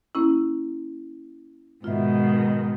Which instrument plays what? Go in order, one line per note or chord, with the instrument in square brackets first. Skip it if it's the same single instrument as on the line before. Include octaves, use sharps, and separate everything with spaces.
[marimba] A#3 C#4 E4
[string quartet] G#2 B2 D#3 [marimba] F4 E5